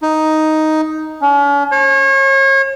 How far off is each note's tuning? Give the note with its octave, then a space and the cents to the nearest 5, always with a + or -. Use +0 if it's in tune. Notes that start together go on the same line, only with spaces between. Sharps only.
D#4 +5
C#4 +40
C#5 -35